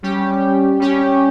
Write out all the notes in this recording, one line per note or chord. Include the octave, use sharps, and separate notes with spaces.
G3 C#4 G4
G3 C#4 G4